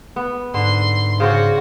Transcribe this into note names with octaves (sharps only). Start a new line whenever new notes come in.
B3
G#2 D3 C6
C#3 F#4 C5 D5